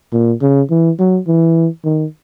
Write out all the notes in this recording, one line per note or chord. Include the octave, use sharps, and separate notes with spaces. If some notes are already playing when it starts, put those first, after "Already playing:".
A#2
C#3
E3
F#3
E3
D#3